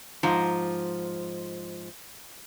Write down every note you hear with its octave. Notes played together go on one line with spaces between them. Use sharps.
G#2 F3 A#5